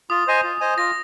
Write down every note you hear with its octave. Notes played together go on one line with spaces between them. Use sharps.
F4 D#6
C5 D#5 G#5
F4
C5 D#5 G#5
F4 A#6